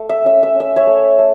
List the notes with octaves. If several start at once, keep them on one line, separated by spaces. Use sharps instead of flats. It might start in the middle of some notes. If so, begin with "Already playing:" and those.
Already playing: A3
E5
C#4 E5
E5
C#4
E5
C#5 E5
A3
A3